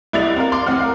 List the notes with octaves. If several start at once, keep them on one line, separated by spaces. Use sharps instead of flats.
C2 E4 D5 D#5 A6 F7
C4 A#4 D5 F5
C6 D6
A1 C4 F#5 F6
A#4 F5